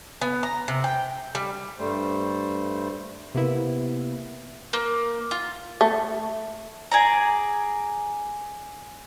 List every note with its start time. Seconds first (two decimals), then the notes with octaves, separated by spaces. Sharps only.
0.21 B3
0.43 A#5
0.68 C3
0.84 G5
1.35 G3
1.79 G2 G3 A3 C5
3.35 C3 A#3 B3 E4
4.73 A#3
5.31 F4
5.81 A3
6.91 G#4 D5 A#5